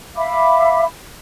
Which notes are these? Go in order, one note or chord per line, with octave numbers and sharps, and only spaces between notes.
E5 F5 B5 D6